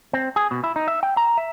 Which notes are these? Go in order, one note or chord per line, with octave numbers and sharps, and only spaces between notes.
C4
G#4
B2
E4
D#4
E5
G5
A#5
E5